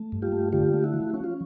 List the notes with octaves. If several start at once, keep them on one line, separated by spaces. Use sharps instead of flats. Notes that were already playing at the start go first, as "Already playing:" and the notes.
Already playing: A3
G2
F4 G4
A3
D3 F4 G4
A3
E4 F#4
F3
C#4 F#4
F4